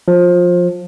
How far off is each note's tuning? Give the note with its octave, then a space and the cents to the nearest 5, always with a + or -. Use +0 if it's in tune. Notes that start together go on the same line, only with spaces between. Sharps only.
F3 +20